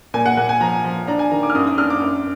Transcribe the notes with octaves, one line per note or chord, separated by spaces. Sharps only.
A#2 G#5
F#5
A#2 F#5
G#5
F3 A#5
F3
D4 A#5
G#5
D#3 A#5
D6
F6
F#2 D#6
D#6
D4 F6
D6
F#2